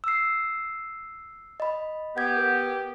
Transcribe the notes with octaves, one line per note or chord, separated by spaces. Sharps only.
E6 C7
D#5 B5
B3 G4 F#5 G#6
A#4